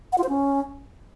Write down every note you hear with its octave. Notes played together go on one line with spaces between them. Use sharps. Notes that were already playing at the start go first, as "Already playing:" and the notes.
F#5
F4
C5
C#4